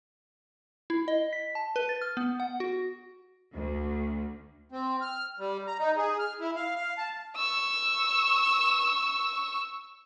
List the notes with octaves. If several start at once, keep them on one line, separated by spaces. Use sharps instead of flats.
E4
D#5
B6
A5
B4
A6
F6
B3
F#5
F#4
D2
C4
F6
G3
A#5
D#4
G#4
F6
E4
F5
F5
A5
C#6 E6